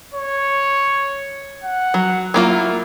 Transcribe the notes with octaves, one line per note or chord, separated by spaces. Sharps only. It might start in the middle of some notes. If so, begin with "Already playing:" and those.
C#5
F#5
F#3
F#3 A#3 E4 F4